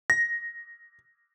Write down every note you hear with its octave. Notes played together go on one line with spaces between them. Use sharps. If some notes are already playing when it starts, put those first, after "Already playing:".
A#6